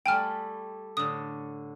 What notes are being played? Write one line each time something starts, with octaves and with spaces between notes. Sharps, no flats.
G3 A3 E4 G5 G#5 F6
A2 D3 D#6